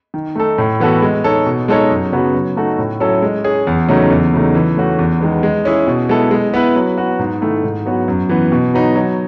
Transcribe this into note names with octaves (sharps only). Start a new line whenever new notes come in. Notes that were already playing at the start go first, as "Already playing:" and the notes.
D#3
A3 D#4 A4
A2
E3 B3 F#4 A4
G#3
D#4 A4 C#5
B2
G#3 D#4 A4 C#5
F#2
C#3 F#3 B3 F#4
F#3
A3 D#4 F#4 A4
A2
F#3 C#4 E4 A4
G#3
C#4 G#4
E2
C#3 F#3 A3 D#4
E2
C#3 F#3 A3 D#4
E3
A3 C#4 F#4
E2
D#3 G#3 B3
G#3
C#4 E4 G#4
B2
G#3 B3 E4 A4
G#3
B3 E4 B4
F#3
B3 F#4
G#2
D#3 A3 E4
G#2
F#3 B3 F#4
F#2
E3 B3
B2
F#3 B3 D#4
F#3